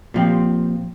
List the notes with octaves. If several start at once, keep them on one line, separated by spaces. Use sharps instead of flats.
A#2 F3 C4 G4